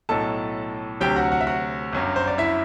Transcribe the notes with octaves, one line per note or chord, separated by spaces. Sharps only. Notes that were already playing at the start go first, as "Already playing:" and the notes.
B1 A2 F#3 A4 A5
D2 C3 F#3 G4 G5
F#4 F#5
F#4 F#5
E5
F#4 F#5
G1 F#2 F#3
C5
D5
E4 E5